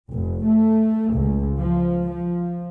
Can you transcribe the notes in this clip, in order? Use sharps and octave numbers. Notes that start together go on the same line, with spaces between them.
F1
A3
C#2
F3
F3